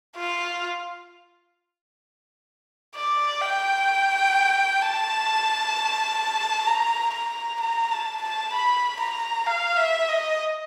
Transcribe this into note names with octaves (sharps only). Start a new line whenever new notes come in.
F4
D5
G5
A5
A#5
A#5
A#5
A5
A5
B5
A#5
F5
E5
D#5